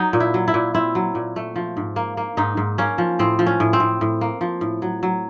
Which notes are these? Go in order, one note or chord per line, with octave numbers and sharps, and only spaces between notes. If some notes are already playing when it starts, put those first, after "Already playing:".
Already playing: F#3 D#4
A#2
E4
F#3
E4
A#2
C4 E4
F#3
A#2
A3
F3
G#2
A#3
A#3
G#2 D#4
G#2
A#3 C#4
F3
A2 C4
F3
C#4
A2
C4
A2
A2
A#3
F3
A2
F#3
F#3